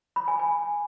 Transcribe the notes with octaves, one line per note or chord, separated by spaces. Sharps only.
B5
G#5
G#5